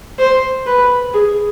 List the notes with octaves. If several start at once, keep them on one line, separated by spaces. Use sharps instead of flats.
C5
B4
G#4